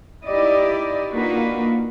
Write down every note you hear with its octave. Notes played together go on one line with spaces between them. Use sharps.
D#4 E4 G4 D5 D#5
A#3 D4 D#4 F4 F#4 B4